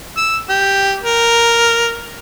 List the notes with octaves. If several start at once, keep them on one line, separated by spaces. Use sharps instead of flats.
E6
G4
A#4